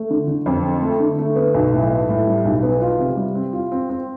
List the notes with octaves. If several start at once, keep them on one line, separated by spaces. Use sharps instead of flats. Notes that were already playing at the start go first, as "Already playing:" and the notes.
Already playing: A3
D3
D3
F2
C4
A3
D3
A3
B3
B1
A2
B3
A2
G3
B1
B3
F4
C3
G3
C4
F4
C4
C4